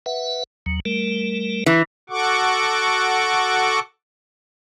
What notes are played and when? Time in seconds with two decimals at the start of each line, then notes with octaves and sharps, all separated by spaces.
0.06 B4 E5 F#5
0.66 D#2 F#3
0.85 G3 A3 A#4
1.66 E3
2.10 F#4 A4 F#5 C#6 D6